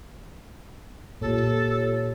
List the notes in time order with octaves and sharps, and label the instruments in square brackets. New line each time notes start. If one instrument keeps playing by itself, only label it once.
[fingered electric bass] A#2 [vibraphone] F4 G4 C#5 [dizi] A4